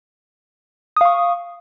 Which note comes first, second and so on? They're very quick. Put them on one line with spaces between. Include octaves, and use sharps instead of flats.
D#6 F5 C#6